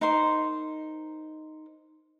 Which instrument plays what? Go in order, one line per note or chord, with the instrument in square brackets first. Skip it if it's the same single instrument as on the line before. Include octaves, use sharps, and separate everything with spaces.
[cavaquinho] D#4 A#4 C5 C6